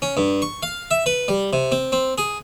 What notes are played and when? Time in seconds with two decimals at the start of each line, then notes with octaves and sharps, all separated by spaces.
0.02 C#4
0.17 G2
0.42 C#6
0.63 F5
0.91 E5
1.06 B4
1.28 G3
1.53 C3
1.72 C4
1.92 C4
2.18 G#4